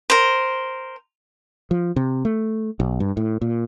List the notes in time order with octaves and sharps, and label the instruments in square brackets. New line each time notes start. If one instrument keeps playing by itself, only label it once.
[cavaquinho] A#4 C5
[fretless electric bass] F3
C3
A3
B1
G2
A2
A#2